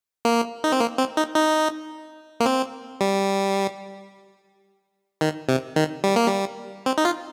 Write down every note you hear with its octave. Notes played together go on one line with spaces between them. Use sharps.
A#3
D#4
C4
A#3
C4
D#4
D#4
A#3
C4
G3
D#3
C3
D#3
G3
A#3
G3
C4
D#4
F4